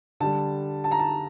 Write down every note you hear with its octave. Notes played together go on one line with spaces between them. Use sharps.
D3 G3 A5
A5
A#5
A5